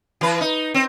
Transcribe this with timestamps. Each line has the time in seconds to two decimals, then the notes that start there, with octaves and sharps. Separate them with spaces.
0.21 E3 B4
0.41 D#4
0.74 C4